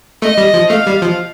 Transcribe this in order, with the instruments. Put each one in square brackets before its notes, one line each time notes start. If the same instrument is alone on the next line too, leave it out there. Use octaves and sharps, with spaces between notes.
[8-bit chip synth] A3 [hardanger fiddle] D#5
[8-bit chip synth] G3
F3
[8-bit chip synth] A3 [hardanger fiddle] F5
[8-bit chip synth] G3
F3